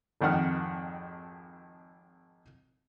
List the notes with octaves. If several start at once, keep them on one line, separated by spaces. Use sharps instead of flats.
G#1 F2 D#3 F#5 F6